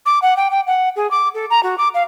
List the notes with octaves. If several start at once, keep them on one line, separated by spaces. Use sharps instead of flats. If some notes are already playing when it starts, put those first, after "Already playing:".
D6
F#5
G5
G5
F#5
G#4
D6
A4
A#5
F#4
D6
F5